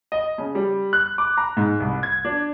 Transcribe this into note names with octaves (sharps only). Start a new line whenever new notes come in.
D#5
C#3
G3
F#6
D6
A#5
G#2
C2
G#6
D4